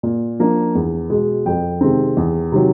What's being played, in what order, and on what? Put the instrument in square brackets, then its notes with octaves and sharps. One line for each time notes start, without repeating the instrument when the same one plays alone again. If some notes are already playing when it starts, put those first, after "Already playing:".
[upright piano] A#2
F3 A#3 D4
E2
B2 G#3
F2 G5
C3 D#3 G#3 C4
E2
C3 D#3 F#3